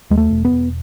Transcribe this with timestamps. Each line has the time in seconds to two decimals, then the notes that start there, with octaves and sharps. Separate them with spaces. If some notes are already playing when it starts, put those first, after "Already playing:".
0.10 D#2 G#3
0.17 A3
0.31 E1
0.45 B3
0.51 E1